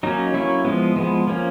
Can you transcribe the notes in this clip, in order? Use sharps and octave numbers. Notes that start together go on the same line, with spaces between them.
F#3 A#3 C#4 D#4
F#3 A#3 C#4 E4
F3 G#3 B3
F3 G#3 B3
F3 A#3 C#4